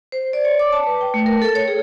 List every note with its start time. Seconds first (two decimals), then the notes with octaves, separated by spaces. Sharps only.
0.12 C5
0.33 D5
0.45 C#5
0.59 D6
0.73 A5
0.87 B4
1.01 G5
1.14 A3
1.26 A#4
1.42 A4
1.55 C#5
1.68 G#4